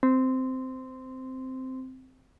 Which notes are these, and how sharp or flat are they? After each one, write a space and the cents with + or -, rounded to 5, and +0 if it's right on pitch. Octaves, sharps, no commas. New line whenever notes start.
C4 -10